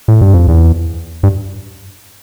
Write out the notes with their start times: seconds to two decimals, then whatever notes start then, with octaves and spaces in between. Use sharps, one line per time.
0.08 A2
0.21 G2
0.34 F2
0.48 E2
1.23 G2